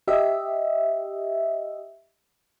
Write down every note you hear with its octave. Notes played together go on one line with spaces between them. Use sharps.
G4 D#5 E5